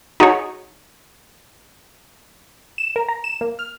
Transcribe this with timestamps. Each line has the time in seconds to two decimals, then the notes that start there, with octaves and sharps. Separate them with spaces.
0.20 D#4 F#4 G#4 C#5
2.78 E7
2.96 A#4
3.09 A#5
3.24 E7
3.41 A#3
3.59 F6